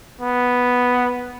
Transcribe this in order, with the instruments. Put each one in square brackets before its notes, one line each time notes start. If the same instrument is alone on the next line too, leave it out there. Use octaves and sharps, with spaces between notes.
[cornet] B3